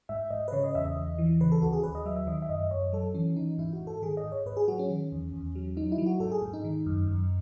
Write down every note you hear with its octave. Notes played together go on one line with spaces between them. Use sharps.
G#2 E5
G#2 D#5
B4
C#3 C#5
D#5
E2 E5
D#5
E2
E3
C#3 B4
A4
D#2 F#4
G#4
D#2 B4
D#5
F#3 E5
E5
D#3 D#5
E5
F#2 D#5
F#2 C#5
F#3 A4
E3 C#4
E3 D#4
G#2 E4
F#4
G#2
A4
D#3 G#4
D#5
G#2
C#5
G#2 B4
G#4
F#3 F#4
C#4
D#3
E2
E2
F#3
F#3 D#4
E4
F#3
F#4
G#2 A4
G#4
G#2
D#4
D#3
F#2
F#2